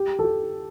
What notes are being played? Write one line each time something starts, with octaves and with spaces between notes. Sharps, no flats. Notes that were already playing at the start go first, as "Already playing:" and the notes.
Already playing: G4
A4
G4